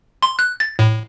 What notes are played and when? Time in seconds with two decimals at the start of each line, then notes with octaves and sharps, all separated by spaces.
0.22 C6
0.39 F#6
0.60 A6
0.79 A2